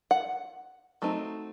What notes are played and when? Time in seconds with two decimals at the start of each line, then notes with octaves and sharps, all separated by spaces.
0.11 F#5
1.02 F#3 A3 C4 D#4